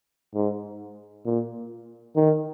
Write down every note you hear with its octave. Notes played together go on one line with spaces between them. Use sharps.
G#2
A#2
D#3